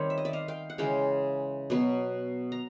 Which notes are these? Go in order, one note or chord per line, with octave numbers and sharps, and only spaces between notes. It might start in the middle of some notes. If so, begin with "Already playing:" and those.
Already playing: D#3 G3 C4 C#5
E5
D#5
D5 E5
D#5 F5
F5 G5
F#5
C#3 E3 G#3 F5 G5
B2 F#3 B3
A#5